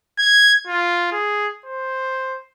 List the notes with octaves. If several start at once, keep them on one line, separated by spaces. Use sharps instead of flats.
G#6
F4
G#4
C5